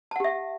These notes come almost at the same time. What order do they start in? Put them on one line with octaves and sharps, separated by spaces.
A5 F#5 G4 E5